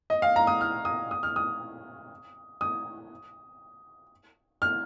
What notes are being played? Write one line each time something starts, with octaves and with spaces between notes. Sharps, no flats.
D#5
F5
A#5
D#6
F6
D#6
D#6
F6
D#6
D#6
F6